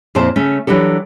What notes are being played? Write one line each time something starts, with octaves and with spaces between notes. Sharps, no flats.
F2 A#2 C4 E4 C5 A5
C#3 A3 C#4
E3 F#3 D4 G4 A4